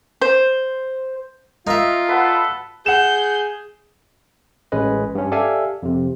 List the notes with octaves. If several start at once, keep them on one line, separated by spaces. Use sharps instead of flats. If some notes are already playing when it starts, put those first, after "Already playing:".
C5
D#4 F4 A#4 E5 F5
A4 B4 F#5
G#4 F#5 G6 E7
A1 G#3 C#4 B4 D#5
G2 C#4
G4 A4 D5 E5 F5 G#5
F2 C3